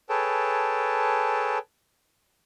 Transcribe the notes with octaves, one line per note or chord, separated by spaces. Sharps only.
G#4 A4 B4 C#5 G5 A5